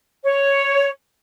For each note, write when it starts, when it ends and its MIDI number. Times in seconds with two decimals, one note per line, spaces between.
0.24 0.90 73